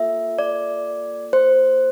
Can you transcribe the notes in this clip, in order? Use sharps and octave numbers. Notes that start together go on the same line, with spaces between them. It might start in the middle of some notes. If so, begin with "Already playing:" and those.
Already playing: A#3 F4 A4 E5
D5
C5